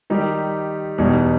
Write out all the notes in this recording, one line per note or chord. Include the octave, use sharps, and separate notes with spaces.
D#3 G3 D#4 G4
E2 B2 G3 D#4